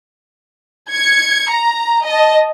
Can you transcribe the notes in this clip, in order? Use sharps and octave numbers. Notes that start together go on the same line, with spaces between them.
G#6 C#7
A#5
D#5 A5